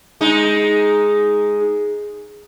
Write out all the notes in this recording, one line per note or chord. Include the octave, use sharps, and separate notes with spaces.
G#3 D#4